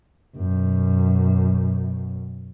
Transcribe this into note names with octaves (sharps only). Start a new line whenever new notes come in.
F#2 B2